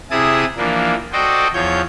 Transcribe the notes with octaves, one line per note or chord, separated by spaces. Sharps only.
C3 E4 G#4 A5 D#6
E3 F3 A#3 D4
F#4 A4 C5 D5 D#5 G5
E2 F3 C#5 G6